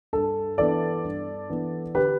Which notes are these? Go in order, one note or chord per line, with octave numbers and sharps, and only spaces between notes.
G2 A4
E3 B3 D4 A4 D5
G2
E3 B3 D4
D3 G4 B4